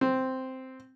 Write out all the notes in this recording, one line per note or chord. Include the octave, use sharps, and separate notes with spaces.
C4